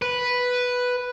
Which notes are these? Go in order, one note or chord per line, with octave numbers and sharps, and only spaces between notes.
B4